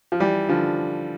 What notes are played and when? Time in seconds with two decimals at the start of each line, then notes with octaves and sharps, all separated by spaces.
0.12 F3
0.20 E3 G3
0.49 D3 F3